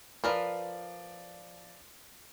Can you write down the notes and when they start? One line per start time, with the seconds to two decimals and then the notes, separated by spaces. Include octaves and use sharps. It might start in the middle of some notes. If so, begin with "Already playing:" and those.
0.24 F3 A#4 B4 D5